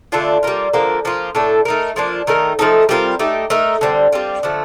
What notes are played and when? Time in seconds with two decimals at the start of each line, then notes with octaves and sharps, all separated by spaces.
0.12 D3 A3 D4 F4
0.43 G3 A#3 F4
0.73 D3 F3 A#3
1.05 F3 A#3 F4
1.35 A2 A3 D4 A4
1.65 A3 D#4 A#4
1.96 F3 A#3 D4 F4
2.27 D#3 A3 D#4 A#4
2.59 F3 A3 D#4 A4
2.89 G3 C4 F4 A#4
3.19 A3 D#4 G4
3.50 A3 D#4 A#4
3.81 D3 G3 C4
4.12 G3 C4 F4
4.43 D3 F3 A3